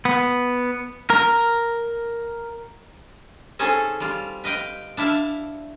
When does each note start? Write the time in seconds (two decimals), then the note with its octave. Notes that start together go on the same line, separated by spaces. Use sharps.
0.05 B3
1.10 A#4
3.59 C4 C#4 D#4 G#4 A4
4.00 G3 F4
4.44 B4 D#5 F5 G5
4.97 D4 E4 E5 F5